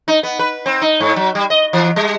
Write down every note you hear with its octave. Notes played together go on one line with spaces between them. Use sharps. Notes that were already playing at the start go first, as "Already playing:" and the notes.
D#4
B3
B4
C4
D#4
G#2
F#3
G3
D#5
E3
G3